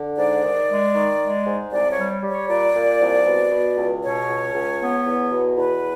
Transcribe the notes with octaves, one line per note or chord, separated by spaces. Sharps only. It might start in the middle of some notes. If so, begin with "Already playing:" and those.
Already playing: D3
G#2 D5
D#3
G#3
D#3
G#3
G#2
C2 D5
C#5
G3
G3
C#5
A#2 D5
A#2
C2
B2
B2
C#2
B2 C#5
C#2
C#2
B3
E2
B2
E2 B4